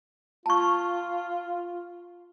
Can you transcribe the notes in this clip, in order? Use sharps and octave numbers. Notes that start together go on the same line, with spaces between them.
F4 A5 C#6